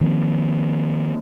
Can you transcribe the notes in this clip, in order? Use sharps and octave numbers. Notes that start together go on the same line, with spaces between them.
D#3 F3 A#3 C4